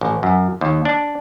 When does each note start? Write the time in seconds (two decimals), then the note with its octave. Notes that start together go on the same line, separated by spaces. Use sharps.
0.01 A1
0.23 F#2
0.61 D#2
0.85 D4